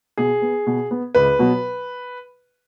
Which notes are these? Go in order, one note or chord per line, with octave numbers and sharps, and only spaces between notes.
B2 G#4
B3
B2
B3
C#2 B4
B2 F#3 B3